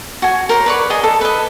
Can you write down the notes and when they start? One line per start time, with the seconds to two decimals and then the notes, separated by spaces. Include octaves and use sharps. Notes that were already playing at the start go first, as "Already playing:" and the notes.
0.22 F#4 G#5
0.49 A#4 C5 C#5
0.66 B4 D5 C#6
0.90 G#4 D5 D#5 G#5
1.03 A4
1.21 B4 D#5